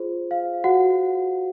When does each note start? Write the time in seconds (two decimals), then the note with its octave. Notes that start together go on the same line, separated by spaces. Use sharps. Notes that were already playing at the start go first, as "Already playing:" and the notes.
Already playing: F4 G#4 C5
0.31 F5
0.64 F#4 F#5